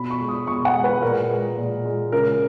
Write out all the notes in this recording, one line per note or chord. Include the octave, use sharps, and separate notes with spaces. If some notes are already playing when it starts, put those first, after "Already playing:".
Already playing: B2 B5
C#6
G#3
D#6
B2 C#6
F#5
G#3
B4
A#2 A#4
G#3
A#2
G#3
C#3 A#4